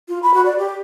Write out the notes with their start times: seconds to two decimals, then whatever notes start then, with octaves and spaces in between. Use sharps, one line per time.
0.08 F4
0.23 B5
0.34 F#4
0.45 D5
0.58 G4